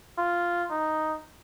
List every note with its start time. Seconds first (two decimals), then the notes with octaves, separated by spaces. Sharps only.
0.18 F4
0.70 D#4